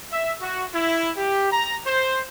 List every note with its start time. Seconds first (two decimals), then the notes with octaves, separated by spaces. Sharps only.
0.12 E5
0.41 F#4
0.74 E4
1.17 G4
1.52 A#5
1.86 C5